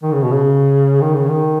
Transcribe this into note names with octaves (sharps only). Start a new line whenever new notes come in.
D#3
C#3
B2
C#3
D#3
C#3
D#3